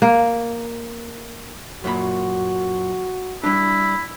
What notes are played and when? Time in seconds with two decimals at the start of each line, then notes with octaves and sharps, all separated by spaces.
0.02 A#3
1.84 F#2 A#2 F#4 B5
3.43 G3 D4 E4